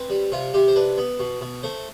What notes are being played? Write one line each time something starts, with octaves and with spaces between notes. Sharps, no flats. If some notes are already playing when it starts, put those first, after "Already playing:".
Already playing: C4 B4
G3
C3 F4
C3 G4
C5
D4 B4
B3
B2
B2
A3 C5